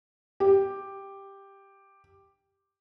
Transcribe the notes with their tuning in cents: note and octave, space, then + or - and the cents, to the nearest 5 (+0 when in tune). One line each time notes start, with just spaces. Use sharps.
G4 +5